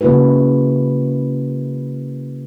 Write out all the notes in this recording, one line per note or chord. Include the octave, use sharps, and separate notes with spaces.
C#3 A#3 E4 F#4 B4